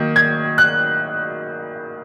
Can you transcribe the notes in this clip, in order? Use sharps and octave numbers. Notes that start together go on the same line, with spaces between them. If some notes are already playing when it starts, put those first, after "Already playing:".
Already playing: D#3 F#3 A#3
G#6
F#6